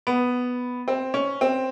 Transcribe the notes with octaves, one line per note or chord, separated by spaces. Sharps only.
B3
C4
C#4
C4